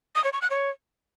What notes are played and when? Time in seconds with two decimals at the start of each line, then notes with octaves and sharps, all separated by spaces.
0.16 D#6
0.24 C#5
0.33 C#6
0.42 F#6
0.50 C#5